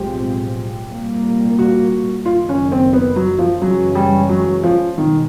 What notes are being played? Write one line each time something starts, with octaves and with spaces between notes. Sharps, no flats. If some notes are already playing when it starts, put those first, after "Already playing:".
Already playing: B1 A2 F3 G#3 C4 G4
C2 A#2 G3 A#3
F#4
F#1 F#2 D#3 F4
C#4
C4
B3
F#3
F3
F#2 C#3 E3 F#3 G#3 C#4
G3
F#3
F3
C2 B2 D#3 G#3